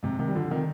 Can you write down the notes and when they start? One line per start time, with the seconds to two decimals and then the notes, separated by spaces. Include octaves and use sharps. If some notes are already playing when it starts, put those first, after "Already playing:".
0.03 G#2 C3
0.19 C3 D#3
0.28 G3
0.35 D3 F3
0.50 C3 D#3